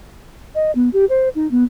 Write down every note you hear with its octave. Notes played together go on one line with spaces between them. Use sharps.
D#5
B3
G4
C5
D#4
B3